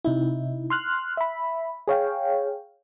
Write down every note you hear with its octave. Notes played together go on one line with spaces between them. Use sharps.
C3 D#4 E4
C6 F6 F#6
E5 B5
G#4 C#5 F5 G5